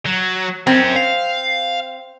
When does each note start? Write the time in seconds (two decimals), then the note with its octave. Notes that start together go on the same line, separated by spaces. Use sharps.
0.06 F#3
0.67 F#2 C4 C#4
0.96 F5